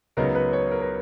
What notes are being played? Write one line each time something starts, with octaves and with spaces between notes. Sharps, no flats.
C#2 C#3 F#3 B3 D#4 A#4
B4
C#5
A#4
A#4